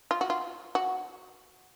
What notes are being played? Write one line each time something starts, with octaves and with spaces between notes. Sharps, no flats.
F4
F#4
F4
F#4